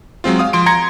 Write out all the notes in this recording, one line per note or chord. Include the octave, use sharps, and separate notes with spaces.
F#3 G#3 C4 F4
F5 D#6
F3 C6 D7
A#5 C6 G#6 A#6 C#7